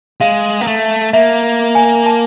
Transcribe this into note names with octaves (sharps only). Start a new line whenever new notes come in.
G#3 F5
A#3
A3
A#3 E5
G#5
A5